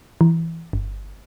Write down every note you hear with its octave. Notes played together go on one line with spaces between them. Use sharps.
E3
G1